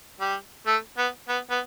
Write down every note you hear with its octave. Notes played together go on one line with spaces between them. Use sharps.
G3
A3
B3
B3
B3